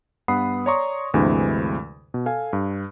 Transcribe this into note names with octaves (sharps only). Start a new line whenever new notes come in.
G2 B3 F#5 B5 D#6 C7
C#5 D5 A#5 C6 C#6 D#6
D2 G2 C3 E3 G#3
B2
A4 F5 G#5
G2